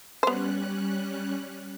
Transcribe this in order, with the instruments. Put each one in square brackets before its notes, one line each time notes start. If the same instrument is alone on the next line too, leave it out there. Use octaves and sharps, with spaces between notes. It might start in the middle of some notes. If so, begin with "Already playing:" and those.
[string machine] G3 C#4 F#6 [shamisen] B3 C5